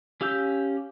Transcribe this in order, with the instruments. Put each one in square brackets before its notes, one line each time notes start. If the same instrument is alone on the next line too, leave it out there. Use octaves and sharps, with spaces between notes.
[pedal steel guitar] C#4 G4 F5 E6 G6